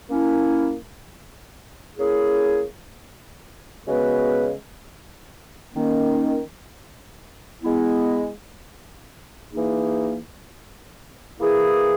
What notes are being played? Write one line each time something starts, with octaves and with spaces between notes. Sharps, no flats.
A#3 C#4 E4
A#3 C#4 E4 G#4
C#3 G#3 B3 F#4 B4
D#3 A#3 C#4
G#3 B3 E4
E3 A#3 D#4 G#4
E3 A#3 E4 G#4